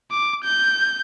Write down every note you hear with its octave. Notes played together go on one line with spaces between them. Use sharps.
D6
G6